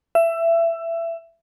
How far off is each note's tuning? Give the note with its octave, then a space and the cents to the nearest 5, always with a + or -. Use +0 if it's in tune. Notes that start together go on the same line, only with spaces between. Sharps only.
E5 +20